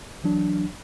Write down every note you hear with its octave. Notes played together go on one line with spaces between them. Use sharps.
E3 F#3 D4